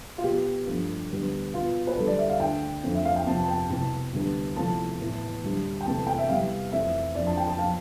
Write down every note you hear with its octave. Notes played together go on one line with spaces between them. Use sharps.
F4
B2 B3 G4
G2 F3 A3
D2 D3 G3 B3
B2 B3 F4
B4
D2 D3 G3 A4
D5
E5
F5
D2 D3 A3 G5
F2 D3 F3 A3
E5
F5
G5
F2 C3 F3 B3 A5
A5
G5
C2 B2 B3 A5
D2 D3 G3 B3
E2 C3 F3 A3 A5
A2 E3 B3
D2 D3 G3
G5
E2 C3 E3 A3 A5
G5
E5
C2 C3 G3 B3 F5
F2 E3 A3 E5
F2 D3 F3 D5
A5
G5
A5
F3 B3 F5